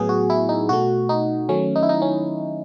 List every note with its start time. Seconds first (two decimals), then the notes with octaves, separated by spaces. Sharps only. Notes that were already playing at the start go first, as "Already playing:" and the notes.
Already playing: A2 F#3 B3 G#4
0.09 F#4
0.30 E4
0.49 D#4
0.69 B2 A3 F#4
1.09 D#4
1.49 D#3 F#3 A3 C#4
1.76 D#4
1.83 E4
1.89 D#4
2.02 C#4